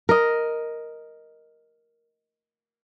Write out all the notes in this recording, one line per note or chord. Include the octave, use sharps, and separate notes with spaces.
A#4 D#5